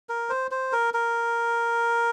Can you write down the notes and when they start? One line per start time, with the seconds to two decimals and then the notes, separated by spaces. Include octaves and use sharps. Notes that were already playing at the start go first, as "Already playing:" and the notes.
0.09 A#4
0.30 C5
0.51 C5
0.73 A#4
0.94 A#4